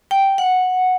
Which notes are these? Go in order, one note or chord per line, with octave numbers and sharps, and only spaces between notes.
G5
F#5